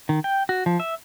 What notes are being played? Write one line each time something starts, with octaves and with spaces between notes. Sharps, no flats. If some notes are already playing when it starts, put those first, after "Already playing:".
D#3
G5
F#4
F3
E5